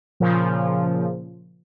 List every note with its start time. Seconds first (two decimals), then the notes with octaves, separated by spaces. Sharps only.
0.20 A#2 C#3 F3